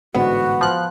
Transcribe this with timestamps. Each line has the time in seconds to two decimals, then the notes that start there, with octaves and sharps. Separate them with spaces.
0.14 A1 G#2 D3 B3 F#4
0.61 F3 F#6